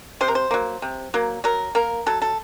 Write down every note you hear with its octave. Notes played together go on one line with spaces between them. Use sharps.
C3 C5
A#4
C5
F#3 A#3
C3
F#3 A#3
F#3 A#4
A#3 A#4
F#3 A4
A4